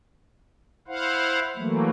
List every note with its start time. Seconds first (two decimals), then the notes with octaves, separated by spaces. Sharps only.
0.88 E4 C5 F5 F#5
1.56 E3 F#3 A3 A#3